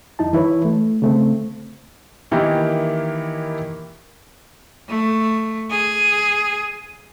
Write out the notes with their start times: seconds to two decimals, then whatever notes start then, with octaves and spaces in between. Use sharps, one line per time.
0.19 F2 D#4 E4 A5
0.33 E3 E4 B4 C#5
0.65 A3
1.02 C#3 A3 C4
2.31 D#3 E3 A#3 E4 G4
4.89 A3
5.71 G#4